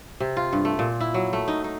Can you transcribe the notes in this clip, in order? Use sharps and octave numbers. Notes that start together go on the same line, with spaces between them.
C3
F4
G2
A3
A#2
E4
F#3
A3
D#4
D#4